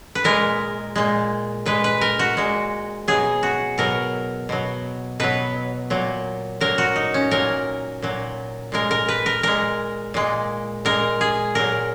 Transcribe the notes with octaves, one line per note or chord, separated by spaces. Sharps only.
B4
A#2 G#3 A#4
A#2 G#3
A#2 G#3 B4
B4
A#4
F#4
A#2 G#3
B2 F#3 G#4
F#4
B2 F#3 A#4
B2 F#3
B2 F#3 B4
A#2 F#3
A#2 F#3 A#4
F#4
D#4
C#4
A#2 F#3 A#4
A#2 F#3
A#2 G#3 A#4
A#4
B4
A#4
A#2 G#3 A#4
A#2 G#3
A#2 G#3 A#4
G#4
A#2 F#3 A#4